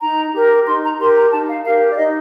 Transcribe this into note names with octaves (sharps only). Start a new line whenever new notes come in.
D#4 A#5
G4 A#4
D#4 C6
A#5
G4 A#4 C6
A#5
D#4 A5
F5
G4 A#4 F5
D5
D#4 D#5